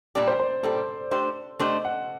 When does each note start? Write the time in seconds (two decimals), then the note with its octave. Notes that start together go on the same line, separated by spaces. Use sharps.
0.15 A#2 G3 D4 G4 D5
0.27 C5
0.39 C5
0.63 A#2 G3 D4 G4 A4
1.11 A3 D4 G4 C5
1.59 A3 D4 G4 C5 D#5
1.85 F#5